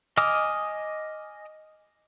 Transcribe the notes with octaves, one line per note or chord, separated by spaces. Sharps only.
D#5 G#5 D6 D#6 F6